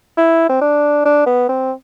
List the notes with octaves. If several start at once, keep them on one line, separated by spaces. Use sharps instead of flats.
E4
C4
D4
D4
B3
C4